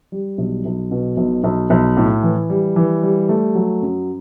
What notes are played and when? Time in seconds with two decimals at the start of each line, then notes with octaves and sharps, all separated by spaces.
0.12 G3
0.38 B1
0.65 B1
0.91 B2
1.17 B1
1.44 B1
1.70 B1
1.97 A2
2.23 E3
2.50 G3
2.76 E3
3.03 G3
3.29 A3
3.55 F#3
3.82 F#2